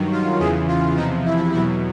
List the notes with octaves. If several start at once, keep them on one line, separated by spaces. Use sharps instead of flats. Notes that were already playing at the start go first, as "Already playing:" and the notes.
Already playing: G2 D#3 F#3
F4
E2 C#3 E3 G#4
F4
E2 C3 F3 D#4
E4
E2 B2 F#3 E4